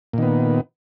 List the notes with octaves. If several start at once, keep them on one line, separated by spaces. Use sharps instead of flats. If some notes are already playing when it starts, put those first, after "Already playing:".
A#2 D#3 B3